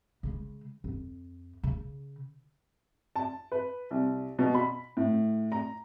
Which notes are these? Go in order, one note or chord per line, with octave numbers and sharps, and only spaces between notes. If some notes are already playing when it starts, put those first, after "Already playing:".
C#3 G#3
F2
C#3
A5
B4
C2
B2
B5
A2
A#5